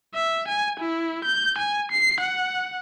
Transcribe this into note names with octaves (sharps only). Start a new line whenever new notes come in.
E5
G#5
E4
G6
G#5
C7
F#5